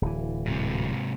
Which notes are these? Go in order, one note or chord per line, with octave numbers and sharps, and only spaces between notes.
D1 E3
G#2 C3